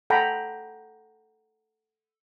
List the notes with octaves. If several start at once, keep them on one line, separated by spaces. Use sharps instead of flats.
A4 F#5 G5 A#5 B5